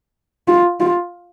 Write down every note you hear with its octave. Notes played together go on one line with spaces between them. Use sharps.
F4
F4